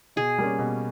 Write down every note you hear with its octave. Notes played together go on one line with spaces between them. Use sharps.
B2 G#4
G3 A#3 C#4
B2